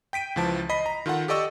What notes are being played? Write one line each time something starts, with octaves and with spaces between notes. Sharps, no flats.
G5 B6 D7 D#7
C#2 E3 F3 A5
D#5 B5 B6 C7
A#5
D#3 F4 A4 F#5
G4 A4 D5 D#5 C#6 E6